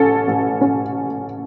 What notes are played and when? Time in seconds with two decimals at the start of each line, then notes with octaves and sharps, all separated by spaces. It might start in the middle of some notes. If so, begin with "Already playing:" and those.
Already playing: A1 C#4 A4
0.27 A1
0.61 C#4